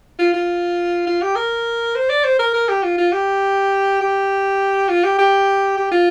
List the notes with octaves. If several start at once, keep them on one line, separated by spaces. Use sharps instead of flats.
F4
F4
F4
G4
A#4
C5
D5
C5
A#4
A#4
G4
F4
F4
G4
G4
F4
G4
G4
G4
F4